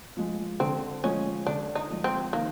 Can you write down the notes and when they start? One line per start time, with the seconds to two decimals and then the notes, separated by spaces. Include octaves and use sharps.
0.17 F3 G#3
0.60 D3 C4
1.04 F3 G#3 C#4
1.46 D3 D4
1.75 D#4
1.90 F3 G#3
2.04 C4
2.33 D#3 A#3